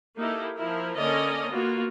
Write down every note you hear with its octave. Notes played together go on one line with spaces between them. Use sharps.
A#3 D#4 E4 G4 A4
F3 E4 A#4
D3 A#3 C#4 A#4 D5 D#5
A#3 B3 F4 F#4